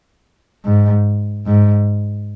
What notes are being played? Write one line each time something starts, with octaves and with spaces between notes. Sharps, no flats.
G#2
G#2